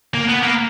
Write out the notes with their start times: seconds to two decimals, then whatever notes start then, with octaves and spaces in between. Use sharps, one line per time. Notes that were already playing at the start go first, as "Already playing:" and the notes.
0.15 A#3
0.29 B3
0.43 A#3